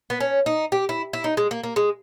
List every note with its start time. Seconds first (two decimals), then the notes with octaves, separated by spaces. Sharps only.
0.10 B3
0.20 C#4
0.46 D#4
0.72 G4
0.89 E4
1.13 E4
1.24 D#4
1.37 G#3
1.51 A#3
1.63 A#3
1.76 G#3